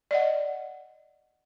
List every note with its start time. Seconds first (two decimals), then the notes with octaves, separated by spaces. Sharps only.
0.11 D5 D#5 F#5